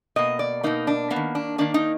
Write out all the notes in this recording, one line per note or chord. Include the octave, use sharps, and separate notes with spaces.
B2 A#3 D#5
D5
B2 A#3 D#4
D4
A#3 B3
D#3
D4
D#3 A#3 D4
D#4